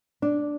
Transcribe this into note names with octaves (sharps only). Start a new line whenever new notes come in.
D4